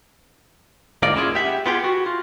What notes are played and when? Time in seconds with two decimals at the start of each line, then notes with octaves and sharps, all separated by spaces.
1.02 D2 G#2 A#3 F4 D5 D#5
1.16 C#4 E4 F4 G#4
1.35 G4 E5 F#5
1.66 B3 F4 G4 G#4
1.84 F#4
2.06 F4